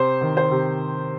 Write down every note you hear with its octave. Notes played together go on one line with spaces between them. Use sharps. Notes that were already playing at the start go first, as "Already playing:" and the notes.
Already playing: C3 C5
D#3
C5
C3